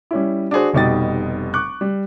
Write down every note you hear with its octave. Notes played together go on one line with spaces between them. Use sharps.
G3 C#4 E4
D4 F#4 G#4 C5
F1 B2 G3 D#4 G4 A6
C#6 D6 F#6
G3